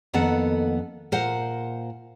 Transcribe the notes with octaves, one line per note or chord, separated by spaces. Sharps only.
F2 D#3 A#3 B3 A4 F#5
A#2 A#4 C5 F5 F#5